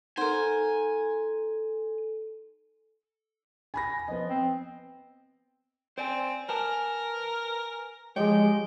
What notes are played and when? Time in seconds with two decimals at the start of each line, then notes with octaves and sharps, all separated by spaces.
0.17 D#4 A4 A#4 C5 F#5 G#5 C6
3.74 G#5 B5 A#6
4.08 F3 B3 D#5
4.29 C4
5.98 C4 C5 D5 G#5
6.49 A#4 B4 G#5 A5
8.16 F3 G#3 G4 C#5 G5